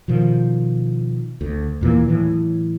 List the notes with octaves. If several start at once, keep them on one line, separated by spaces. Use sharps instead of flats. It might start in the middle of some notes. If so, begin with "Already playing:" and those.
B2 D#3 F3
D2
D#2 A#2 E3 A#3
A2 E3 F#3